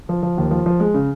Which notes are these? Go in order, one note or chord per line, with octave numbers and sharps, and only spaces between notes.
F3
F3
D#2
F3
F3
G#3
C#3